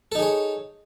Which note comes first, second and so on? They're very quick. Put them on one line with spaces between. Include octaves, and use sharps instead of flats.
A4 D#4 G#4 C#5